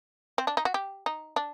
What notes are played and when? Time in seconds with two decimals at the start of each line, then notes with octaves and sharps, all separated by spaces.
0.38 C4
0.47 D4
0.57 D#4
0.65 F#4
0.74 G4
1.06 D#4
1.36 D4